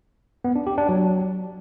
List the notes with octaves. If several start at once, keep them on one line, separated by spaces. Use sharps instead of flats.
B3
D4
G4
D4
F#3